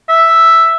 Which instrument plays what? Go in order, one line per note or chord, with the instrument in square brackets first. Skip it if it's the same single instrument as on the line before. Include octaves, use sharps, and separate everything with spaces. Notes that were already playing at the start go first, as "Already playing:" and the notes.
[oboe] E5